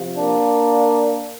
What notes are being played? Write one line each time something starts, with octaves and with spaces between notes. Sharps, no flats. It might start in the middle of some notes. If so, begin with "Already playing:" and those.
Already playing: C3 F3
A#3 D4